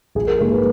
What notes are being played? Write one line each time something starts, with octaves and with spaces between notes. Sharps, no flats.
A#1 G#4
A#4
G#2 G3 A#3 A#4
B4